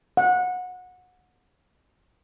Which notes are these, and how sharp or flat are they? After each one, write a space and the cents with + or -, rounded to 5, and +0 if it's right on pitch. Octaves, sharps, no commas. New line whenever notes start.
F#5 -25